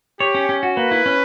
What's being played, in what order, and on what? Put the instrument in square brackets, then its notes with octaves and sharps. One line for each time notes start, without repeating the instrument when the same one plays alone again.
[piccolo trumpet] G4 [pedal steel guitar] C#5
[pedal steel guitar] C#4
C#4
F#4
[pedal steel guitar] A#3 [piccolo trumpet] B4
[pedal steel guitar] E4
C#4